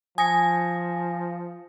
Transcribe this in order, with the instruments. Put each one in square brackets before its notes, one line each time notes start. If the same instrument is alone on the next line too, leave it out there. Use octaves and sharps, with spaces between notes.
[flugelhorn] F3 [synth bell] G#5 [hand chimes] D#6 A#6 C#7